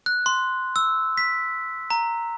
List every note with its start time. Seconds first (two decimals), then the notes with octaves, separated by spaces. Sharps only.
0.06 F#6
0.26 C6
0.76 E6
1.17 B6
1.90 A#5